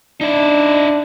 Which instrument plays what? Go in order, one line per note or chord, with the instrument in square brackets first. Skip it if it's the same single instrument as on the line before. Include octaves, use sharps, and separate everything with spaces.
[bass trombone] D4 [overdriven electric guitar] D#4 E5